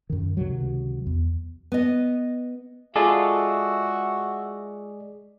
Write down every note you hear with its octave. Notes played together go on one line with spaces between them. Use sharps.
F#2 D#3
C#2 C3 D#3 F#3
E2
B3 D#5
G#3 F4 F#4 G#4 A4 D5 E5